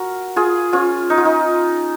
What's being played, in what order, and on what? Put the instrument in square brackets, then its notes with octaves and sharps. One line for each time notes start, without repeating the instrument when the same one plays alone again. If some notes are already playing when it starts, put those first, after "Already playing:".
Already playing: [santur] F#4 A#4
F4 G#4
C#4 F4
D#4
F4
D#4